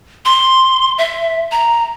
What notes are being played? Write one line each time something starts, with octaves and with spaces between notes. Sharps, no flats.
C6
E5
A#5